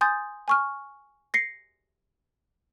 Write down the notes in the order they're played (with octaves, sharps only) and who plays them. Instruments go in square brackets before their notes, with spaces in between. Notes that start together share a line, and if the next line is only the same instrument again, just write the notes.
[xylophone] G#5 C6 D#6 G6 A6
G#5 C#6 F6
A#6 C7 C#7